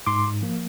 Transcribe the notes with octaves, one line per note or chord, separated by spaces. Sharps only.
G#2 C6 D6
F3 A#3